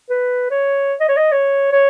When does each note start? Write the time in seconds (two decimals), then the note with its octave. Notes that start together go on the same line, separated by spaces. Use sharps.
0.10 B4
0.51 C#5
1.00 D#5
1.09 C#5
1.17 D#5
1.32 C#5
1.72 C#5